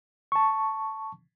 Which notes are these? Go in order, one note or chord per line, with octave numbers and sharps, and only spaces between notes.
A5 C#6